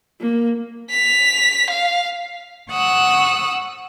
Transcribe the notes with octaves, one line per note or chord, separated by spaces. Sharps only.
A#3
B6 F7
F5
F#5 C#6 D#6 E6 F#6